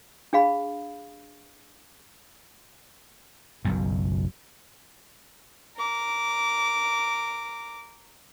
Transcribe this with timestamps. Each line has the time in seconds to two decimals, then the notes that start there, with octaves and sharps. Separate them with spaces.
0.33 D4 G#4 F5 B5
3.65 F#1 B1 F#2
5.76 A#4 D6